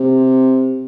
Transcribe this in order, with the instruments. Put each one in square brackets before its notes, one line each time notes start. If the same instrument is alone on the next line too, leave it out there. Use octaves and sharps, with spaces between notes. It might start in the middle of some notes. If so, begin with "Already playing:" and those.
Already playing: [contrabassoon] C3